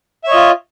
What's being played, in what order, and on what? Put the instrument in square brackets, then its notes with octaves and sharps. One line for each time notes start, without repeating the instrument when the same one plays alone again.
[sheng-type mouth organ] E5
C#5
D#5
F4